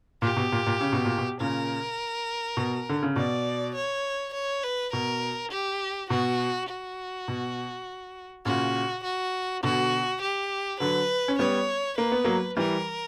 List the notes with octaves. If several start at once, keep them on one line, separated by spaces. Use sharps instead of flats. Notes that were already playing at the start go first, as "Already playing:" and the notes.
A#2 G4
B2
A#2
A#2
C#3
B2
A#2
B2
A#2 C#3 A#4
B2
D3
C#3
B2 D5
C#5
C#5
B4
B2 A#4
G4
B2 F#4
F#4
B2
A#2 C#3 F#4
F#4
B2 D3 F#4
G4
D3 F#3 B4
C#4
G3 B3 C#5
A#3 B4
B3
F#3 A#3
E3 G3 A#4